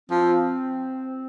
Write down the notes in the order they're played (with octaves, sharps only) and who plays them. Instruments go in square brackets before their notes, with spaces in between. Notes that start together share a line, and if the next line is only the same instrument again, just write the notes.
[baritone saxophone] F3 [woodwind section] C4